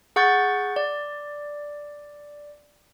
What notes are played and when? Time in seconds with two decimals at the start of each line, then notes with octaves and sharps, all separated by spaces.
0.16 G#4 F#5 C#6 G6 A6
0.76 D5